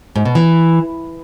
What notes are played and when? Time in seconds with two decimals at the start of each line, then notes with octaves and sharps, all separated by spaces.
0.16 G#2
0.25 B2
0.35 E3